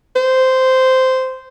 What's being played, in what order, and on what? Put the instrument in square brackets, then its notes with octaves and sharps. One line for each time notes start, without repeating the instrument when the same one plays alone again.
[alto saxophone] C5